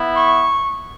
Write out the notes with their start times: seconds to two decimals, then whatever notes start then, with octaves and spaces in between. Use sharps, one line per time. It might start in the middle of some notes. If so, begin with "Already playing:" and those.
Already playing: B3 E4
0.16 C#6